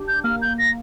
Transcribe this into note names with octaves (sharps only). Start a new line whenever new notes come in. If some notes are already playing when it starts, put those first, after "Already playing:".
Already playing: D4 G4
G6
A#3 F6
G6
A#6